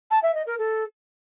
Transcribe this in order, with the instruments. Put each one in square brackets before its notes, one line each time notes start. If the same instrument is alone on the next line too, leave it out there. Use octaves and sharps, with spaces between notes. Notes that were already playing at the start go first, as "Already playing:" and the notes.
[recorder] A5
E5
D#5
A#4
A4